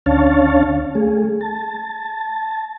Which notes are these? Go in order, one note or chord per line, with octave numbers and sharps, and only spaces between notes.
D2 C#4 D4 C#5 F5 A5
A3 G#4
A5